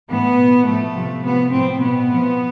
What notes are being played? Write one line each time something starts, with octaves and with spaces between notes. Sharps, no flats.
A2 E3 B3
B2
A2 F3 A3
C3 F3
C3 F3 B3
A2 F3 C4
B2 B3
A2 F3